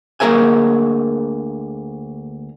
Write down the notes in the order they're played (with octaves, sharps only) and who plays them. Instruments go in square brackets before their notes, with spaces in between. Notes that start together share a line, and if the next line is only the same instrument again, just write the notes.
[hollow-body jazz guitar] D2 A#3 G#4 A#4 E5 G#5